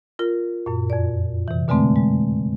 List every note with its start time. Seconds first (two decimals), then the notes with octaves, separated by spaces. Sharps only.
0.19 F4 A#4
0.66 F#2 A#2
0.90 F2 D5
1.48 C3 E3
1.68 B2 D3 G#3 A3 C4
1.96 G#3